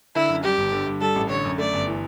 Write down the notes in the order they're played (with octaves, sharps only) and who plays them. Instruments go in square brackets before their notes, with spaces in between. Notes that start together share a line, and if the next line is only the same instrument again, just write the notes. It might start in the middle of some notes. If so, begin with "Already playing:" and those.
[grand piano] D3 [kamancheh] E4
[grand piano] F#2
[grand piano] G3 [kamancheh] G4
[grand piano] G1
D3
G2
[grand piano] G3 [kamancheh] A4
[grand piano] A1
[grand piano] D3 [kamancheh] C#5
[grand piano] F#2
[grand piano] A3 [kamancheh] D5
[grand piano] G1
E3